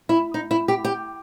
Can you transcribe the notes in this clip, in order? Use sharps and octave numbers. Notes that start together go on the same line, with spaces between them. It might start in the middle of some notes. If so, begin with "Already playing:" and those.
E4
D#4
E4
G4
G4